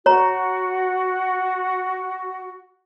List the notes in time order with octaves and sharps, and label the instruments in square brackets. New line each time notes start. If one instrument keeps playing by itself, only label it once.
[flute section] F#4 [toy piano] C#5 A#5